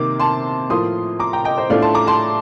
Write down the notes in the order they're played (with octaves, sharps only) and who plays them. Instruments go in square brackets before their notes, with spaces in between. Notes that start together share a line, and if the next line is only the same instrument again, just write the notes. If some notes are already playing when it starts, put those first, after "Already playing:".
Already playing: [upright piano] C3 D#3 A#3 D6
A5 C6
A2 F3 A#3 F4 C6 D#6
A#5 D6
G5 A#5
D#5 G5
C5 D#5
A2 A3 D4 F4 D5 F5
A5 C6
A#5 D6
A5 C6